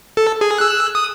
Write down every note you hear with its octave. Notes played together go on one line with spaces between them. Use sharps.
A4
G#4
E6 F#6
D#6